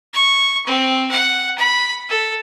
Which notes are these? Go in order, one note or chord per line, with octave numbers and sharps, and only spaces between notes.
C#6
C4
F#5
B5
A4